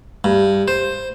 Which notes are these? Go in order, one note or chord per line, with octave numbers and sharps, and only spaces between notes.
G2
C5